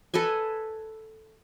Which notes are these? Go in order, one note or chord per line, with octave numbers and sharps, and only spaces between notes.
A4 B4 D#5 G#5